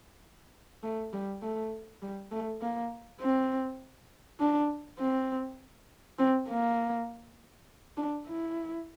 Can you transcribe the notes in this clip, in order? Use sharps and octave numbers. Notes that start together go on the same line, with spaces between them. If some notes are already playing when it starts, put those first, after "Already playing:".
A3
G3
A3
G3
A3
A#3
C4
D4
C4
C4
A#3
D4
E4